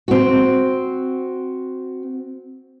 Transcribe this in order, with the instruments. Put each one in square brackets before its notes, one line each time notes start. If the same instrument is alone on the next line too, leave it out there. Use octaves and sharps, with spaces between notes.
[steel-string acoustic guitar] C4 F#4